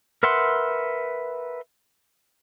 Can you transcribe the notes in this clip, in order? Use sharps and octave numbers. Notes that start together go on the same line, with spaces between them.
A#4 B4 E5 F#5 C6